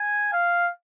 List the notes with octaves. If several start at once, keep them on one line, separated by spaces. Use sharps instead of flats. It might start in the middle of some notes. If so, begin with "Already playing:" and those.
Already playing: G#5
F5